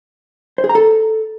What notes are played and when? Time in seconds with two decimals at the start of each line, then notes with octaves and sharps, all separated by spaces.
0.58 C5
0.64 G#4
0.69 A#5
0.75 A4